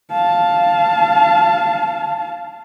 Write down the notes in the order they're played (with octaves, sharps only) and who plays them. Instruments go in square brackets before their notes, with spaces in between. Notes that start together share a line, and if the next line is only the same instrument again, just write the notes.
[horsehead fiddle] F5 A5